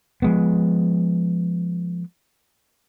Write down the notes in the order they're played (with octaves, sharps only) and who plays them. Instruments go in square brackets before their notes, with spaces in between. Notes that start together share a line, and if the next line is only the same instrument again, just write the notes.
[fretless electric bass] F3 G#3 B3